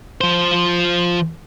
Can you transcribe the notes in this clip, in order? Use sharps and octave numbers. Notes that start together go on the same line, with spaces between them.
F3 C5